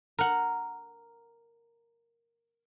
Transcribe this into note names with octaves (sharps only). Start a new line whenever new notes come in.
A#4 F#5